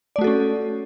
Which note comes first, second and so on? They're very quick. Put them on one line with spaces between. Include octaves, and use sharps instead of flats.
D5 A3 F#4 A4 C#4